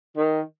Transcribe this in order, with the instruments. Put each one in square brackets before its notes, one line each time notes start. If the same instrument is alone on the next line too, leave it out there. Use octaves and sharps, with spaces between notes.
[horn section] D#3